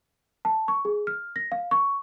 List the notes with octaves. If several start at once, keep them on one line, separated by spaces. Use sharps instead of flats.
A5
C#6
G#4
F6
A#6
F5
C#6